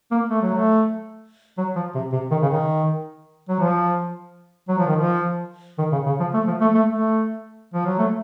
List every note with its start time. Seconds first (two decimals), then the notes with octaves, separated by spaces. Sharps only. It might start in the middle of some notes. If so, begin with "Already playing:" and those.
0.11 A#3
0.30 A3
0.41 F#3
0.55 A3
1.58 F#3
1.76 F3
1.95 C3
2.12 C3
2.31 D#3
2.42 C#3
2.49 D#3
3.49 F#3
3.59 F3
4.69 F#3
4.78 F3
4.87 D#3
4.96 F3
5.78 D#3
5.92 C#3
6.06 C#3
6.20 F3
6.34 A3
6.47 F3
6.61 A3
6.75 A3
6.88 A3
7.74 F3
7.86 F#3
7.99 A3